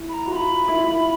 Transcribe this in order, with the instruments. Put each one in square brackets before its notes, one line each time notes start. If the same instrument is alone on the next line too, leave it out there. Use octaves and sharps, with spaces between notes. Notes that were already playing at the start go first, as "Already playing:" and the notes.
Already playing: [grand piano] E4
[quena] B5
A#5
[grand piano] F#4
[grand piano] F4 [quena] B5 C6
[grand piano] E4
F4
E4